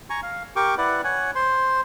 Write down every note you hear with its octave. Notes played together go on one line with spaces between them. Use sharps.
G#5 A#5 C#6
F5
G4 A#4 G5 C#6 D6
E4 B4 D5 F#5
C#5 F#5 G#5
C5 C6